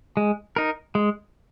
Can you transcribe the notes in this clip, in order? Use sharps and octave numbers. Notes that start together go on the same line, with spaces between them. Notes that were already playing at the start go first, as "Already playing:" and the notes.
G#3
D#4 A#4
G#3